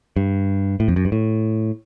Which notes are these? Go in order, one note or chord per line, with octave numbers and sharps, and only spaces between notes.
G2
A2
F2
F#2
G2
A2